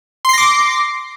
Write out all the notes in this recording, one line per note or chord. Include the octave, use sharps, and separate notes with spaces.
C6 D6 A#6 C7